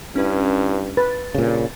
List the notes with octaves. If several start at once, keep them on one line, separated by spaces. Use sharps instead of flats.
G2 C#4 E4 B4
B4 A6
G2 A#2 C#3